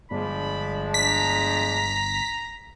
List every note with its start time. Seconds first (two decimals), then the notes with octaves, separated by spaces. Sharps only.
0.11 G1 F3 G#3 D4 B5
0.94 A#5 B6